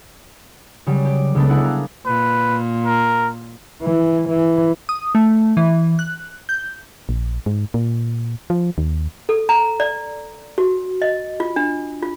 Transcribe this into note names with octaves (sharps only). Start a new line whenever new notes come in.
C#3 F#3 G3
G4
C#2 C#3 G#3 B3 D4 A4
D4 E4 G#4 F#5
A#4 F5
A#2 B4
A#4
E3
E3
D#6
A3
E3
F#6
G6
A#1
G#2
A#2
F3
D#2
A4
A#5
D5
F#4
D#5
F4
D4
F4